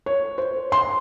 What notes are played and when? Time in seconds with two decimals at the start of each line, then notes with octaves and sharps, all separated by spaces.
0.06 C#5
0.38 C5
0.72 C6